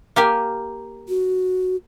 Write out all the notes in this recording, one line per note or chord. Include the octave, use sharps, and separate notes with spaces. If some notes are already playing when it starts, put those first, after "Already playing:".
A#3 G4 G#5
F#4